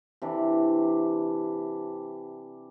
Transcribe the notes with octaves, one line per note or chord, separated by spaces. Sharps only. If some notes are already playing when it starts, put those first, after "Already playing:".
C3 E3 D4